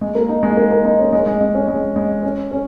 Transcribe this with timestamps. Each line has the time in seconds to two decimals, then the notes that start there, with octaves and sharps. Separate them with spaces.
0.01 G#3
0.15 A#3
0.29 D#4
0.43 G#3
0.57 A#3
0.71 A#3
0.85 D#4
0.99 C#4
1.13 G#3
1.26 G#3
1.41 G#3
1.55 C#4
1.68 G#3
1.96 G#3
2.23 C#4
2.51 C#4